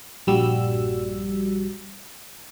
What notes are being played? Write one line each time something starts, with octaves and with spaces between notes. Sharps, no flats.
A#1 G2 G3 F#4 E6